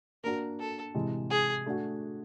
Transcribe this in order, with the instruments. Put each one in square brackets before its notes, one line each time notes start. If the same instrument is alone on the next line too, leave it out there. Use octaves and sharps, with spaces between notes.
[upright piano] A#3 D4 F#4 [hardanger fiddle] A#4
[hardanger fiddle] A4
[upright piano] C3 E3 G#3
[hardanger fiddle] G#4
[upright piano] A3 D4 F#4